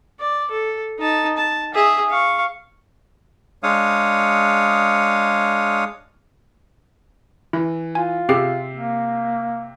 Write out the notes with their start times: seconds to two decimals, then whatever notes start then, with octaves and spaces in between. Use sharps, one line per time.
0.20 D5
0.51 A4
0.99 D#4 A5
1.37 A5
1.74 G#4 E5
2.10 F5 C#6
3.63 G#3 D4 C#5 F5 D#6
7.53 E3 E4
7.95 F4 G#5
8.29 C3 C4 G4 G#4 E6 C7
8.74 A#3